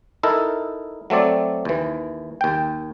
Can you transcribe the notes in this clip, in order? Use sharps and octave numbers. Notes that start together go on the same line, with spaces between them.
D#4 E4 A4 A#4
F#3 A3 C4 D5
D#2 E3
D#2 G5